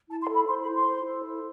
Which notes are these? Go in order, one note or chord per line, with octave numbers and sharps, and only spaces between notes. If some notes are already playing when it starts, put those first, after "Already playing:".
E4 A5
C6
A4
B5
C5 C6
B5
E4
C6
C5
A4
E4